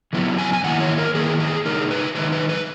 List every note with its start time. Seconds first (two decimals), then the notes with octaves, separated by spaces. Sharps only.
0.13 C#3 F#3 B3 E4
0.38 G#5
0.53 G#5
0.64 D#3 A#3 E4 F#5
0.80 C#5
0.98 A#4
1.14 D#3 A#3 E4 G#4
1.40 G#4
1.65 C#3 G#3 D#4 A#4
1.91 B4
2.15 D#3 G#3 D#4 B4
2.32 B4
2.49 B4